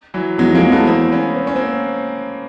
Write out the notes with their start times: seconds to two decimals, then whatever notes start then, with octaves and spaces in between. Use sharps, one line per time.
0.14 E3 F#3
0.38 E2 F#3 G#3
0.51 F2 G#3 A#3
0.65 E2
0.72 A3 B3
0.87 A#3 C4
1.12 B3 C#4
1.37 C4
1.47 C#4
1.56 A#3 C4